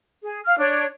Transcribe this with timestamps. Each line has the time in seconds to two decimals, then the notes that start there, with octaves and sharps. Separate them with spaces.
0.22 G#4
0.45 F5 F6
0.58 D4 C#5